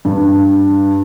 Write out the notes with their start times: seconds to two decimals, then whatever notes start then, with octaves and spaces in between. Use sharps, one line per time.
0.05 G2